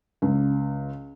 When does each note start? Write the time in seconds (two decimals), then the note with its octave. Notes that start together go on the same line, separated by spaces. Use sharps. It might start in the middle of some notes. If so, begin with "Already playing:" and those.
0.22 C#2